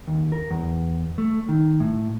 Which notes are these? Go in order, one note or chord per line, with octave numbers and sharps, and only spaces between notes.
D#2
A#4
E2
A3
D#3
A2